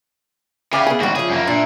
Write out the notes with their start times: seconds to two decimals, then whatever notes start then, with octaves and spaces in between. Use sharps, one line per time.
0.73 C#3 E4 D5 F5 G5 G#5
0.86 B3 G#4
1.00 E2 G#2 G3 F#4
1.15 C#3 F3 G#4
1.30 F#2 A#3
1.47 A#2 D4 E5